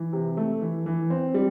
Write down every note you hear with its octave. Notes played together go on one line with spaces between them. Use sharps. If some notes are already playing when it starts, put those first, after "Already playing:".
Already playing: E3
C3
A3
E3
E3
C4
G3